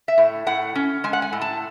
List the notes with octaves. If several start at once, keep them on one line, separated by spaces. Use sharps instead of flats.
E5
A2
A2 F#5
C#4
G#3 G#5
F#5
G#5
A2
A5